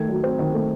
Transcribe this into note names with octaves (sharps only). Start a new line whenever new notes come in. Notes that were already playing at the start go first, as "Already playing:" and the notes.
Already playing: D#3 A3 G#6
F#3
C4
D#3
A3